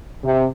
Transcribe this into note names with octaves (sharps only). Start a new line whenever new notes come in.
C3